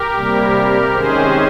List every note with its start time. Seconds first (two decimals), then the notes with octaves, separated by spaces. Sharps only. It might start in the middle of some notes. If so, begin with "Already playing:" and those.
Already playing: G4 A#4
0.14 C3 G3 A#3
0.93 C3 D#3 G#3 C#4 G#4 C5